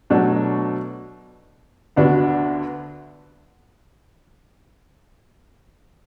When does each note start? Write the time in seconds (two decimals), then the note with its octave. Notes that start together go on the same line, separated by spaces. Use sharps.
0.10 B2 F#3 A3 D4
1.96 D2 D3 B3 D4 F#4